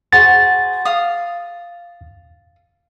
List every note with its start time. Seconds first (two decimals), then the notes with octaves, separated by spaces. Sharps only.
0.13 F#4 G#4 C5 A6
0.85 F5 D#6